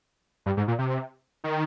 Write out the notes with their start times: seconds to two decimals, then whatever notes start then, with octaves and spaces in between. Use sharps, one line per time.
0.46 G2
0.57 G#2
0.68 A#2
0.79 C3
1.44 D#3